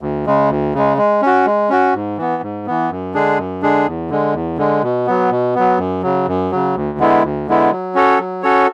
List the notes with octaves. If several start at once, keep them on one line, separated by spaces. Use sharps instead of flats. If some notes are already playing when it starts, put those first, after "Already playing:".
D2
C#3 G#3
D2
C#3 G#3
G#3
C#4 F#4
G#3
C#4 F#4
G#2
E3 B3
G#2
E3 B3
F#2
D3 G#3 D4 G#4
F#2
D3 G#3 D4 G#4
E2
D3 G#3
E2
D3 G#3
B2
F#3 B3
B2
F#3 B3
F#2
C#3 F#3
F#2
C#3 F#3
D2
D3 G#3 B3 E4
D2
D3 G#3 B3 E4
F#3
C#4 F#4 A4 C#5
F#3
C#4 F#4 A4 C#5